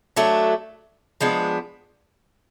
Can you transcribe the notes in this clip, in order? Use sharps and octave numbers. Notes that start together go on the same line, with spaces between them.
F#3 A3 D4
F3 G#3 B3 D4